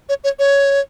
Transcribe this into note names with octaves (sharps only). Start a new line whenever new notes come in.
C#5
C#5
C#5